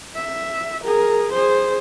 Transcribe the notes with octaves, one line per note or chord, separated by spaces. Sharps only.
E5
G#4 A#4
G#4 C5